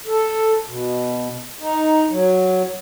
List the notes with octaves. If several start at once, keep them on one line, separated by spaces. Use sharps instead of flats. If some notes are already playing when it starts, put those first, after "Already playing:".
A4
B2
D#4
F#3